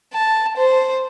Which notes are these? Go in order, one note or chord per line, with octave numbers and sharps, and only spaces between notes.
A5
C5